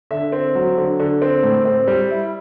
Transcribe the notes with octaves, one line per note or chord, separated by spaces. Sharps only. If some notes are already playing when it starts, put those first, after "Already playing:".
D3 E5
C4
F#3
D3
D3
C4
A2
C4
G3
E4